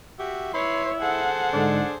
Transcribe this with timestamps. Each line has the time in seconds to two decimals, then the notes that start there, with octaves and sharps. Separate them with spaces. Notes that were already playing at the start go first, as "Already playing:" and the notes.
0.19 F#4 G4 E5
0.54 E4 B4 C#5 B5 C6
1.01 G#4 A4 C5 F#5
1.53 G#2 D3 D4